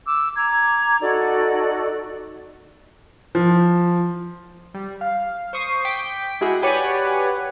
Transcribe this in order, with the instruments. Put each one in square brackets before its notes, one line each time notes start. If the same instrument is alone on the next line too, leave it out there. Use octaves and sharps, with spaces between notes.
[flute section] D6 E6
A#5 D6 G#6
D#4 F#4 A4 D5
[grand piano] F3
[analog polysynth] G3
F5
C5 C#6 D#6 C7
G5 D6 B6
G#3 E4 F#4 G#4 F#5
G4 B4 C#5 D5 F#5 G#5